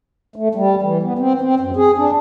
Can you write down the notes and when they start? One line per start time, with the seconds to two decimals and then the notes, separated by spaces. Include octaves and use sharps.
0.36 A3
0.55 G3
0.82 E3
1.03 B3
1.19 C4
1.41 C4
1.60 F#2
1.76 G#4
1.98 D4